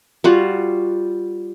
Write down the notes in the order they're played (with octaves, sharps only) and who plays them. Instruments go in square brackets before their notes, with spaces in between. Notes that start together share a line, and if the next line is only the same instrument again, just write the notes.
[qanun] G3 F4 F#4